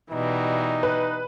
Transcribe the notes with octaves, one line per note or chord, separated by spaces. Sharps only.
B2 E3 G3 D#4
B4